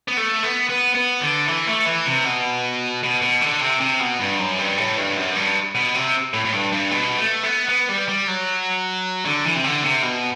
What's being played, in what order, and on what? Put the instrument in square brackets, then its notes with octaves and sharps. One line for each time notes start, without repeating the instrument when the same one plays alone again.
[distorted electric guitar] B3
A3
B3
B3
B3
D3
E3
A3
E3
C3
B2
B2
B2
D3
C3
C3
B2
G2
F#2
G2
A2
G2
F#2
G2
B2
C3
A2
A2
G2
G2
B2
A3
B3
B3
G3
G3
F#3
D3
E3
C3
D3
C3
B2